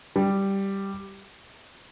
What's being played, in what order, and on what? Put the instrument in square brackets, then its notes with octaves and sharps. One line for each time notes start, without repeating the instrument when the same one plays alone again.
[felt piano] G3